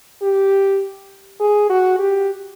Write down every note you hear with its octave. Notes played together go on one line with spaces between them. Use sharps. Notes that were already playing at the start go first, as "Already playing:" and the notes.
G4
G#4
F#4
G4